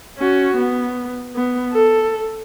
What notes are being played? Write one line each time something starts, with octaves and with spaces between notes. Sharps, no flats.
C#4 F#4
B3
B3
A4